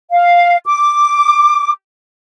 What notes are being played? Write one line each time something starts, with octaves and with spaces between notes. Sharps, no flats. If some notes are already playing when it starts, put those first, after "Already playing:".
F5
D6